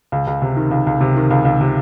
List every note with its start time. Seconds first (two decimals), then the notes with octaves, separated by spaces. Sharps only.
0.12 C#2
0.27 C#2
0.42 C3
0.57 D#3
0.71 C#2
0.87 C#2
1.01 C3
1.16 D#3
1.31 C#2
1.45 C#2
1.61 C3